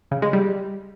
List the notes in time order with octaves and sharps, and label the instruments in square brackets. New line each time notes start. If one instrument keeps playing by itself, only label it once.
[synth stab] C#3
G#3
G3